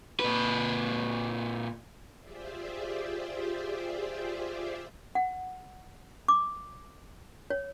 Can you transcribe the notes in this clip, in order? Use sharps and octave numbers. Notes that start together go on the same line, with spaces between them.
A#2 B4
F4 G4 G#4 C5 D5 E5
F#5
D6
C#5